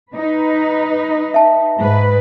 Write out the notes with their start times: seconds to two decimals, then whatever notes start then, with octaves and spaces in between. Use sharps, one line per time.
0.14 D#4 B4
1.34 E5 A5
1.79 G#2 B4